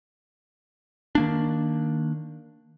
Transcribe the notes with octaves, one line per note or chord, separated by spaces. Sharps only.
D#3 A#3 D4